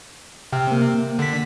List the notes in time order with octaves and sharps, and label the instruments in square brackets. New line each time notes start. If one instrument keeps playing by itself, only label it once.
[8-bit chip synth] C3 [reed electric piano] G5 F6
[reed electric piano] A#3
[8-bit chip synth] D3 B6